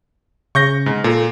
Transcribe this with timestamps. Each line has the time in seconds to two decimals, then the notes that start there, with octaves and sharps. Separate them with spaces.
0.55 C#3 C#6 G6 A#6
0.86 G#2
1.04 A#2 A4